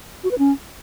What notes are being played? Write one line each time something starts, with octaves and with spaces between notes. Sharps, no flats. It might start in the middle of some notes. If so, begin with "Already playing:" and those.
F#4
B4
C#4